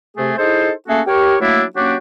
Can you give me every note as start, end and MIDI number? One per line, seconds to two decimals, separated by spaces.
0.17 0.33 48
0.17 0.33 57
0.17 0.33 68
0.38 0.71 63
0.38 0.71 64
0.38 0.71 68
0.38 0.71 69
0.38 0.71 72
0.88 1.01 57
0.88 1.01 58
0.88 1.01 61
0.88 1.01 66
0.88 1.01 68
0.88 1.01 69
1.07 1.35 67
1.07 1.35 70
1.07 1.35 73
1.40 1.63 54
1.40 1.63 57
1.40 1.63 58
1.40 1.63 62
1.40 1.63 64
1.76 1.95 54
1.76 1.95 58
1.76 1.95 61
1.76 1.95 62
1.76 1.95 66
1.76 1.95 67